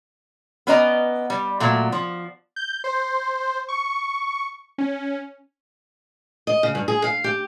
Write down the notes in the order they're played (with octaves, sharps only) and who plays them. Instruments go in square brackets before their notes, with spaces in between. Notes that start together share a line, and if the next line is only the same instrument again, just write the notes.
[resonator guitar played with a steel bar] B3 C#4 B4 D5 D#5 A#5
G3
A#2 F#3 A3
F3
[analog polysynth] G6
C5
C#6
C#4
[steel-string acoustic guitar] D#5
C#3
G2
G#4
F5
G4